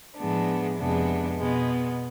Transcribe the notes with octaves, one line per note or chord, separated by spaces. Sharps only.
A2 F3 G#3 B3 D4
F2 C3 G#3 B3 D4
B2 G#3 B3